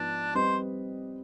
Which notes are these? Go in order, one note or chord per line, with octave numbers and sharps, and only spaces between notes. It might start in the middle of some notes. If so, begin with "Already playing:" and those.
Already playing: G#2 F3 B3 D4
G3 C4 G4 B4 C5 D#5